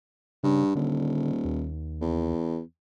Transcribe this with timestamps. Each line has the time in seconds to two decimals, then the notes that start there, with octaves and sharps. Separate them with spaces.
0.43 G2 C#3
0.75 D#1 D3
1.45 D#2
2.01 E2